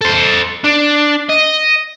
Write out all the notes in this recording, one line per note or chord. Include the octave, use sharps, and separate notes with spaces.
A4 C5
D4
D#5